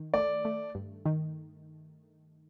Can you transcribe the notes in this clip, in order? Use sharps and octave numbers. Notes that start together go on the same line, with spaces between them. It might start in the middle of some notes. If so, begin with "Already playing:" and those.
Already playing: D#3
A3 D5
A3
G2
D#3